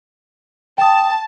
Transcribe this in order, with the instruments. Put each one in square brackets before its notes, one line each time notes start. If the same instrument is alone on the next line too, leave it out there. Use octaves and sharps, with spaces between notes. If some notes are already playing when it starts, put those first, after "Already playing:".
[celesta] G5 D#6 [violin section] A5